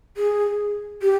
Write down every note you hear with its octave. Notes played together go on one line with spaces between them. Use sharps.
G#4
G4